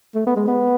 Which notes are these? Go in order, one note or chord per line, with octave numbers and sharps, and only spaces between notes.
A3
B3
G#3
B3